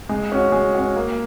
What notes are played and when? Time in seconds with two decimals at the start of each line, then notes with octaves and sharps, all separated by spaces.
0.09 G#3
0.32 C#4 F#4
0.52 G#3
0.75 C#4 F#4
0.96 A#3